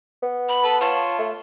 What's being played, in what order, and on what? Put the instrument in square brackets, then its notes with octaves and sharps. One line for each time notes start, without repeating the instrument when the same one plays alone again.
[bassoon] B3
[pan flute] B5
[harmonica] A4 B4 A5
[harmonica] F4 C#5 [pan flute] A5
[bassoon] A3